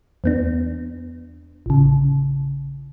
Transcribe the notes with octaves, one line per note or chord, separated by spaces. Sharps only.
E2 B3 D4
A1 C#3